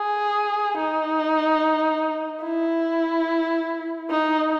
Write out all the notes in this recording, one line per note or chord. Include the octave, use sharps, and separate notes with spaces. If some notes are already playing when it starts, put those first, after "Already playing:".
Already playing: G#4
D#4
E4
D#4